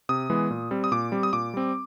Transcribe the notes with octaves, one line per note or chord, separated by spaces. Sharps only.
C3 D#6
E3 G#3 B3
A#2
G3 C4
D#6
A#2 D6
G3 C4
D#6
A#2 D6
G3 C4